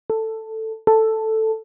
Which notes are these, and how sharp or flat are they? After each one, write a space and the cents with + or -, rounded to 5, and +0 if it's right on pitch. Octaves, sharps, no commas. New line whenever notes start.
A4 +10
A4 +5